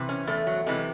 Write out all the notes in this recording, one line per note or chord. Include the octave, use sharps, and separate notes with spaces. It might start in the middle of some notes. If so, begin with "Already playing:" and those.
Already playing: C3 E3
C#4
E2 A3
F#3
C3 E3 G#3